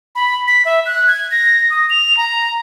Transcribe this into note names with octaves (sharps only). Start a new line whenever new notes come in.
B5
B6
E5
F#6
G#6
A#6
D#6
F7
A#5